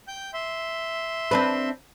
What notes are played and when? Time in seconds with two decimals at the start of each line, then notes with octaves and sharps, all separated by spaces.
0.08 G5 G6
0.34 E5 C6
1.31 C4 D4 B4